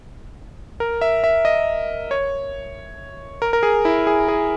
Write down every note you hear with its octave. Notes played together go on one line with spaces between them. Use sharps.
A#4
E5
E5
D#5
C#5
A#4
A#4
G#4
E4
G#4
G#4